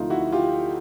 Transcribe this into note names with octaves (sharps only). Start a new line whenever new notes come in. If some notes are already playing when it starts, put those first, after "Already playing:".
Already playing: D2 C3 F3 A3 D#4 F4
E4 F#4
F4 G4